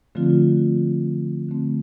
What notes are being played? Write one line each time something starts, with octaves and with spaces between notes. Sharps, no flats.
D3 F3 A3 C4 F4
D3 A3 C4